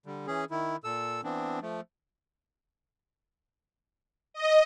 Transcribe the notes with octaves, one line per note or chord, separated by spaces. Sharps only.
D3 G3
E3 C#4 G#4
D#3 E4
A#2 A4 E6
E3 B3 C4 D4
F3 A3
D#5